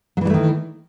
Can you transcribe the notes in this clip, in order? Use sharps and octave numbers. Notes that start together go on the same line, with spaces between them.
D#3 E3 F#3 G3 A3